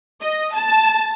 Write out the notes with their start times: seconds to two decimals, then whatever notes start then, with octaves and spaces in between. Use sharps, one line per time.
0.22 D#5
0.54 A5